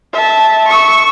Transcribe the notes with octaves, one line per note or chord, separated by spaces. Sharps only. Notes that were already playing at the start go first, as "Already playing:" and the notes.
E5 A5
C#6 E6